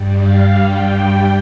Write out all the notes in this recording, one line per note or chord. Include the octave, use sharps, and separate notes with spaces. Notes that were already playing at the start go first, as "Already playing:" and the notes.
Already playing: G2 G3
F5
G5